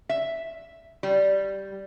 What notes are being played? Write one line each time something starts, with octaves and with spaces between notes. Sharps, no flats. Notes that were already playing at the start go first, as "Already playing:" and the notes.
E5
G3